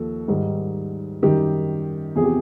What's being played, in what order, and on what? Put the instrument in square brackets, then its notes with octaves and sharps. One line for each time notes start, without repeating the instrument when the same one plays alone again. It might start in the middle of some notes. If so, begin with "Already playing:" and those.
Already playing: [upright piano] D#2 F3 A4
G#2 D#3 G3
F#2 D#3 G3 G4
E2 C3 F3 G#4
G4